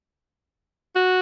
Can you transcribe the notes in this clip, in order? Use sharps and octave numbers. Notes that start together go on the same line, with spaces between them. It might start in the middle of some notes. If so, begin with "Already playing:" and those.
F#4